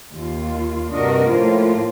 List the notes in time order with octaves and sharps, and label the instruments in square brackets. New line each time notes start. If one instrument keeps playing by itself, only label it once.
[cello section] D#2 F4
[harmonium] G2 C3 D#5 [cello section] D4 F#4 A#4
[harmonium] A2 F3 [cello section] A#3 F4